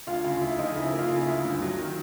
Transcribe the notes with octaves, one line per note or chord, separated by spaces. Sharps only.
D2 F4 F5
C#3 F4 F5
D2 E4 E5
F3 D#4 D#5
C#3 E4 E5
A#3
F4 F5
C#3
E4 E5
D2
G2
F#3
D#3